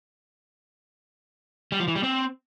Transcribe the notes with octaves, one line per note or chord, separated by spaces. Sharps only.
G3
F3
E3
G3
C4